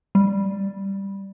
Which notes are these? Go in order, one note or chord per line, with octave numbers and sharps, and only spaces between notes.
G3